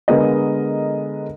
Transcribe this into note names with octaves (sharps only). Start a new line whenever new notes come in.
D3 G#3 B3 A#4 D#5